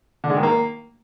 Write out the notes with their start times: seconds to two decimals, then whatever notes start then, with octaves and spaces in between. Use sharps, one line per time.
0.24 D3
0.30 G#3
0.37 D#3
0.43 A#3